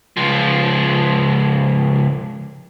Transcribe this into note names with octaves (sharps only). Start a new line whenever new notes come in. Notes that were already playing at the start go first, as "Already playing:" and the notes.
C#2 F3